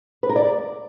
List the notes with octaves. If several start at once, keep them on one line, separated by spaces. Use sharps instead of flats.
B4
A#4
D5